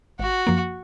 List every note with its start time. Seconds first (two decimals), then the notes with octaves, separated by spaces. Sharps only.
0.19 G#1 F#4
0.47 F#2 F3 A#3